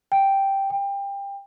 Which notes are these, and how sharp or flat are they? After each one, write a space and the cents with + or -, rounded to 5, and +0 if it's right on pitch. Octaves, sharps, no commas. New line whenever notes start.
G5 +0
G5 +25